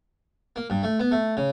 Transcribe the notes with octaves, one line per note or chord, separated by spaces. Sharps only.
A#3
G2
A3
B3
A3
C#3